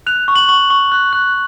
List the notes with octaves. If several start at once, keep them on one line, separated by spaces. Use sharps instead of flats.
F#6 F7
C#6
F#7
C#6
C#6
F#6
F#6